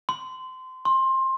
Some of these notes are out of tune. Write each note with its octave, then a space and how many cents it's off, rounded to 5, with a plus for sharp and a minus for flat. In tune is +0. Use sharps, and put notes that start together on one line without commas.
C6 -25
C6 +20